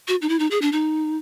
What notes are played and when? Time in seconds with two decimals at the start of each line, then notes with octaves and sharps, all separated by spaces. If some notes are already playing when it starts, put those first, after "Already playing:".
0.08 F#4
0.22 D#4
0.29 E4
0.39 D#4
0.51 G#4
0.62 D4
0.72 D#4